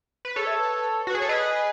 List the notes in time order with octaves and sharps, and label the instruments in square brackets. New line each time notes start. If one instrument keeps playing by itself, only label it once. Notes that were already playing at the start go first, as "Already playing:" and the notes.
[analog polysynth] B4
[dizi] G#4 [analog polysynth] A4 C#5
[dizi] E5
B4
[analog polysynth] F#4 [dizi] B4
[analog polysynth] G#4
[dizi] C#5
[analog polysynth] A4
[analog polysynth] G#4 B4 [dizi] D#5